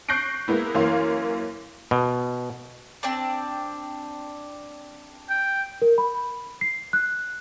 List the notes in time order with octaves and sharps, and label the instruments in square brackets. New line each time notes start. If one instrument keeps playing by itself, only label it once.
[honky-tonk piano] C#6 F#6 G6 A#6 C7 D7
G#3 A#3 B3 E4
F#2 E3 A#3 C#5 F5 C6
[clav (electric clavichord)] B2
[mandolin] C4 D4
[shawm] G5
[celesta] A#4
B5
C7
F#6